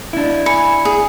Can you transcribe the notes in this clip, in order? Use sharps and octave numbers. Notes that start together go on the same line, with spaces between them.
D4 E4
G#5 B5 C#7
G#4